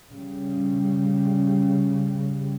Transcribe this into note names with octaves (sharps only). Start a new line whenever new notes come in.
C#3 G3